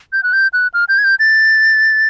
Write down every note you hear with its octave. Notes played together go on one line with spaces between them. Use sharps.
G6
F#6
G6
F#6
F6
G6
G#6
G6
A6